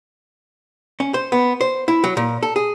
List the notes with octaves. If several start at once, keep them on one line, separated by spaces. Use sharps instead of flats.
C#4
C5
B3
C5
E4
F#3
A#2
A4
G#4